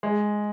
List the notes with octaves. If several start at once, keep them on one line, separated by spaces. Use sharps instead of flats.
G#3